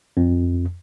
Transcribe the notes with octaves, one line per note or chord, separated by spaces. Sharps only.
F2